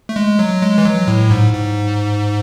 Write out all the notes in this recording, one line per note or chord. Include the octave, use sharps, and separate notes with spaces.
A3
G#3
F#3
G#3
E3
F#3
A2
G#2
G#2